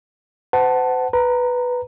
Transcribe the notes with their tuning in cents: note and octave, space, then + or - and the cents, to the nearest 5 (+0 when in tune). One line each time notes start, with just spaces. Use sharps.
C5 -40 F#5 +15 A5 +0
B4 +0 A#5 -10